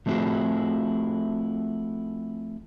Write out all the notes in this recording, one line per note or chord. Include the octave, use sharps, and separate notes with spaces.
F3 A3 C4 E4 F#4 G#4